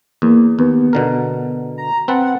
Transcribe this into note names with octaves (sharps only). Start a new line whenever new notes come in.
E2 A#3
D#2 B3
B2 D3 A#4
A#5
C4 B4 F#5 A5